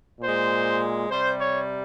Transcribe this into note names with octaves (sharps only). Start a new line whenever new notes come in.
A#2 G#3 C5
C3 G3 C5
C#5